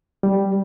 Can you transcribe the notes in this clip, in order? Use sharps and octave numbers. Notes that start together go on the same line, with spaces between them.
G3